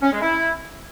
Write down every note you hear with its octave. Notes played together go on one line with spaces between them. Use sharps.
C#4
G#3
E4